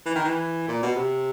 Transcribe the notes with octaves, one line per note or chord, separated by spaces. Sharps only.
E3
D#3
E3
A#2
B2
C3